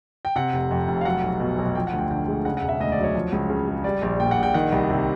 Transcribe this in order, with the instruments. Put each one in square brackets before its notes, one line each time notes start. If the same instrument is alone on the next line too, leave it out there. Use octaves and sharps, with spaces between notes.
[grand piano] G5
C3 F#5
F1
F2
F1
F5
F#3 F#5
B1
B2
B1
F3 G5
F#5
D2
G5
D3 G5
G#3
C#3 F#5
F#5
E1
E5
D2 D#5
D5
F#3
C#5
F3
C#2
C#3
G#3
G3 D5
A#1
A#2 G5
F#5
A#1
G5
D#3 F#5
C2
C3